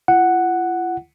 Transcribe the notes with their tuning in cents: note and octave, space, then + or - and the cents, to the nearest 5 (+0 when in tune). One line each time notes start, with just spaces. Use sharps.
F4 -45 F#5 +0